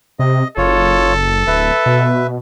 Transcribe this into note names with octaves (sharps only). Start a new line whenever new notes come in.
C3 D#5
F#1 F4 A4 C#5
D1 B4 E5
B2